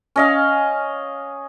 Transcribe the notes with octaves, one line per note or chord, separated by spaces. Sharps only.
C#4 D#5 F5